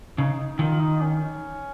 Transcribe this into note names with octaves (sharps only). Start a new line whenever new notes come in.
C#3 D#4
D#4
D#3 F4
D#4
C#4